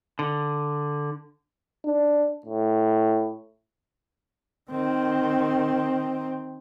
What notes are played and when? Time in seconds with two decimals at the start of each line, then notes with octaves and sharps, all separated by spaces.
0.19 D3
1.85 D4
2.46 A2
4.71 D#3 C4